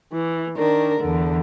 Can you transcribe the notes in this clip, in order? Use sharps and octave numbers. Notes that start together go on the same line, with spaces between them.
E3
D#3 D4 A#4
E2 D3